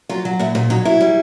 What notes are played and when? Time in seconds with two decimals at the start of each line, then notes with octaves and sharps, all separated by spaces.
0.09 F#3 F4
0.25 F#3
0.39 A#2 E4
0.55 A#2 D#4
0.70 F#3 D#4
0.85 F#3 E4
1.01 G3